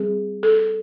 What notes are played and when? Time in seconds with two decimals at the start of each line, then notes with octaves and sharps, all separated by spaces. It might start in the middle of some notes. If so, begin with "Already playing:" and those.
Already playing: G3 C4 G#4
0.43 A4